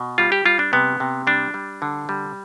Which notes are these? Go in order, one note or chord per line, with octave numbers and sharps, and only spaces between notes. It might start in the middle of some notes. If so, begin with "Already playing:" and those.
Already playing: B2
G3 F4
G4
G3 F4
D4
C3 B3
C3
G3 D4
G3
D3
G3